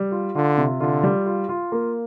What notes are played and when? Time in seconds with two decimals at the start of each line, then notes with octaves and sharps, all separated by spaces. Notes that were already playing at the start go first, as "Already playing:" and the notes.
Already playing: G3
0.12 F4
0.35 D3 F4
0.58 C3
0.80 D3 F4
1.03 G3
1.26 F4
1.49 F4
1.72 A#3